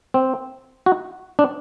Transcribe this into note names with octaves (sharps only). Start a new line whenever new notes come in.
C4
F#4
D4